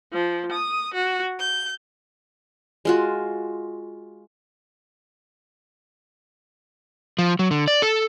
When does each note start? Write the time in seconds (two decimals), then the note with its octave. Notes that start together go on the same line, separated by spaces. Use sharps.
0.12 F3
0.51 D#6
0.94 F#4
1.39 G6
2.85 G#3 F4 F#4
7.18 F3
7.39 F#3
7.51 D3
7.68 D5
7.82 A4